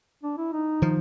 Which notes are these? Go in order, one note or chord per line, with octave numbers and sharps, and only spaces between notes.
D4
E4
D#4
D#3 F3